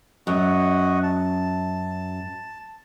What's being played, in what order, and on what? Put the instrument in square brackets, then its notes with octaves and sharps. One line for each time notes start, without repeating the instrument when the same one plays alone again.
[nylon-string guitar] F#2 [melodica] F#4 D#5 F#5
[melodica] A5